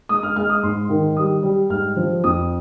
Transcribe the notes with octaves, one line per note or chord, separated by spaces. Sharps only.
G#3 D#6
F6
G#3 F6
D#6
G#2 C6
D#3
G3 D#6
G3
G#2 F6
F3
F2 D#6